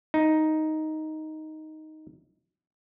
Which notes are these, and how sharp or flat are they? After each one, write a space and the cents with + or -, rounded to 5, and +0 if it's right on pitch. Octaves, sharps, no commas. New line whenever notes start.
D#4 +5